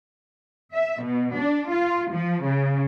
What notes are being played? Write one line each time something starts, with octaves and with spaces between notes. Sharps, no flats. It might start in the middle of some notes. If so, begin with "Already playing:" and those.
E5
B2
D4
F4
F3
C#3